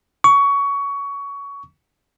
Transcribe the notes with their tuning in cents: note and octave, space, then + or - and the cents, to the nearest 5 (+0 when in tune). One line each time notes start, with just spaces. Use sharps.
C#6 +20